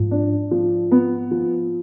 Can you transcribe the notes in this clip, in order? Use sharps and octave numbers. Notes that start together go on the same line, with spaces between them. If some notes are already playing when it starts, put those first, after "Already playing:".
Already playing: G#2 F3
D4
F3
B3
F3